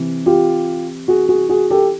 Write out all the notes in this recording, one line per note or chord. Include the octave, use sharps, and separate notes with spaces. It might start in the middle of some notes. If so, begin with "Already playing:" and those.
Already playing: C3 E3
F4 G4
F#4 G#4
F#4 G#4
F#4 G#4
G4 A4